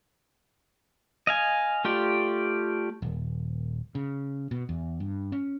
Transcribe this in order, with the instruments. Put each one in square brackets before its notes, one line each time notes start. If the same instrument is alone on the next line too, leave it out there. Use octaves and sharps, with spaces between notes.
[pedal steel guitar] D#5 F5 G#5
A3 F4 G4 D5
[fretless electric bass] D#1
C#3
B2
E2
G2
C#4